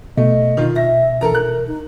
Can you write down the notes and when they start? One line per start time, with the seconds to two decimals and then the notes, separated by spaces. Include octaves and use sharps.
0.17 B2 A3 D#5
0.57 D#3 F4
0.76 E5 A#6
1.21 E3 A4 A#4 A#5
1.35 A#4 F#6
1.67 D#4